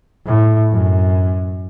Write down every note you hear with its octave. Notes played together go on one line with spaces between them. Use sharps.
A2
F#2